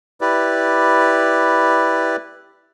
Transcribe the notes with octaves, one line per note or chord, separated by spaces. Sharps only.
E4 G4 B4 D5